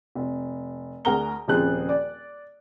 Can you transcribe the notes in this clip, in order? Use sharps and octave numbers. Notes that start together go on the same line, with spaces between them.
F1
D2 G#4 A#4 F#5 A#5 G7
D#1 C#3 F3 C4 G#4 F#6
D5